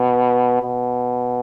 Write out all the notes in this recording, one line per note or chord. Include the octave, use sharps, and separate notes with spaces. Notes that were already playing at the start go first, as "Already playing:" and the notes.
Already playing: B2
B2